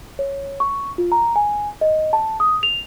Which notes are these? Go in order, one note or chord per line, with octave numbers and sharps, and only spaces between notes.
C#5
C#6
F4
A#5
G#5
D#5
A5
D#6
F7